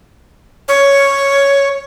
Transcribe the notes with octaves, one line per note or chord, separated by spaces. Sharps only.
C#5